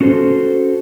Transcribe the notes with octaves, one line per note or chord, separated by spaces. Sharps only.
C#4 F#4 A4 C5